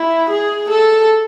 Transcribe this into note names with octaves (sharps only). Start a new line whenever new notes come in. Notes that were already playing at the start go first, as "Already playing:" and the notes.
Already playing: E4
G#4
A4